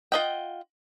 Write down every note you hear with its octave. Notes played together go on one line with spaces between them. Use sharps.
F4 B4 D#5 F#5 G5